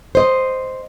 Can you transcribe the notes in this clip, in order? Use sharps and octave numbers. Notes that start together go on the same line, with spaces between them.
C5 D#5